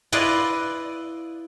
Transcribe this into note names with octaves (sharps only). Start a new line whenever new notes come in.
E4 F4 B4 D5 D#5